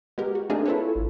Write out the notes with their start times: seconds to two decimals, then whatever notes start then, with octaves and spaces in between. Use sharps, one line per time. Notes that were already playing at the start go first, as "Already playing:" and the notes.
0.18 G#3 B3 G4 A#4
0.35 F#4
0.50 A3 A#3 C4 D4 D#4 G#4
0.66 E4 F4 A4 B4 C#5
0.95 G#1